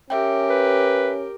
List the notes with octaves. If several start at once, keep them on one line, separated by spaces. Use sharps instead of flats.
C#4 G4 A#4 E5 G5
B4